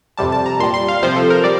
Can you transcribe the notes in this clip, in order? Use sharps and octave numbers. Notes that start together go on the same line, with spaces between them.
F2 C3 G3 A5
A5
A#5
A#2 G3 C6
C6
F5
F2 C3 F3 C5
A4
A#4
G3 D5